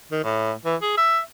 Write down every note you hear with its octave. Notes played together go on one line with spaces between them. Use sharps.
D#3
A2
E3
G#4
E5